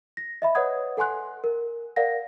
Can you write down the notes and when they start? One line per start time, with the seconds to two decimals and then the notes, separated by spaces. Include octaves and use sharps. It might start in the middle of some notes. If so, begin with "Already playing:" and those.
0.17 A#6
0.42 D#5 E5 B5
0.55 B4 C#5 D#5 F#5 D#6 G#6
0.97 A4 F#5 G#5 C6 F#6
1.44 A#4
1.96 A#4 D5 F5 F#5 A#6